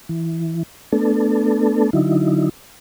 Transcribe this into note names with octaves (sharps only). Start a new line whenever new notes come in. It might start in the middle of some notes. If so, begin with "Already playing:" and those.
E3
A3 B3 D4 A4
D3 F#3 D#4 E4